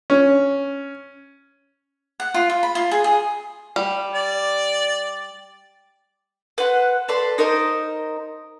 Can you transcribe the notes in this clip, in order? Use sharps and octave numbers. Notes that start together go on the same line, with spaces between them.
C#4
F#5
F4
F4
B5
F4
G#4
G#4
G3
D5
B4 C5 F#5
A4 B4 D5 C6
D#4 A#4 C5 D#5